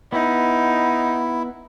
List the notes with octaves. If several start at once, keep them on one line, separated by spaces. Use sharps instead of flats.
B3 D#4 E4